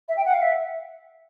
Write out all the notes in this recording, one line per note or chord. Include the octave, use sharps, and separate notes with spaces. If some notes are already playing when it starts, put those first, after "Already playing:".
E5
G5
F#5
F5
E5